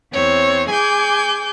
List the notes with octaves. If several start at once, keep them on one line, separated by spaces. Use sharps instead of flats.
E2 C4 C#5
G#4 G#5 D6 G6